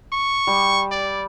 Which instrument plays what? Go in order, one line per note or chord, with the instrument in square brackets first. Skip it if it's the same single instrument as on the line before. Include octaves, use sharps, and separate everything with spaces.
[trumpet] C#6
[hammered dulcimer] G3
[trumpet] D5